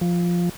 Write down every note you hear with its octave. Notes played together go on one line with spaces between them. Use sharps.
F3